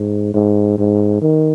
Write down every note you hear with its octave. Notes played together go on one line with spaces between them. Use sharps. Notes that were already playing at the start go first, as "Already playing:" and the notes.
Already playing: G#2
G#2
G#2
D#3